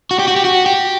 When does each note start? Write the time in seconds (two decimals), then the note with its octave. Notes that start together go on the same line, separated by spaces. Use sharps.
0.11 F#4
0.19 G4
0.28 F#4
0.36 G4
0.45 F#4
0.66 G4